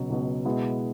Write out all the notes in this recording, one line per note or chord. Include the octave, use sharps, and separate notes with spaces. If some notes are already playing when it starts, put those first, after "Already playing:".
Already playing: C#2 B2 F#3
C#2 B2 F#3
B2 G#3 B3 E4